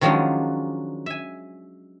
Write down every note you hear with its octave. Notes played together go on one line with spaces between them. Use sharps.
D#3 F3 F#3 G#3 C#4 D4
E5 G#5